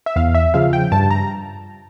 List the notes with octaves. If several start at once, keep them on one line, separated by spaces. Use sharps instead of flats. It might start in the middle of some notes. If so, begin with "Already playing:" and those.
E5
E2 F5
E5
C#3 F3 F5
G5
G2 A5
A#5